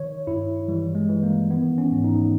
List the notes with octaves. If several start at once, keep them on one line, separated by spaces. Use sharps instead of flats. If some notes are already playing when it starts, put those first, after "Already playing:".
Already playing: D#3 C#5
G2 E4
E3 G3
G#3
E3
A#3
D#3 B3
C#4
G#2
D#4